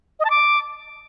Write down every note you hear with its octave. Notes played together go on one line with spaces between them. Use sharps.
D#5
A5
D6